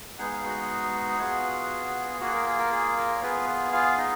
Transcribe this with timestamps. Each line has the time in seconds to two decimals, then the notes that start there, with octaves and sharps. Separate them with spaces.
0.18 G#3 B3 D#4 G#4 F#5
0.32 F5
0.45 F#4 F#5
1.20 B3 F4 G#4
2.21 A#3 F4 F#4 G#4 F#5
2.34 A#4
2.46 G#4
2.59 A#4
2.72 G#4
2.98 A#4
3.16 C#5
3.22 B3 F4 G#4 B4
3.72 F4 F5
3.98 D#4 D#5